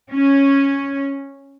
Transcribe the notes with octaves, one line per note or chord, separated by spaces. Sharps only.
C#4